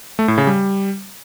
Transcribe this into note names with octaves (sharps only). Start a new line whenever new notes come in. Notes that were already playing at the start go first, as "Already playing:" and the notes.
A3
A2
C#3
G3